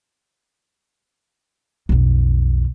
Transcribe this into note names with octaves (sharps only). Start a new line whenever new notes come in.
B1 F2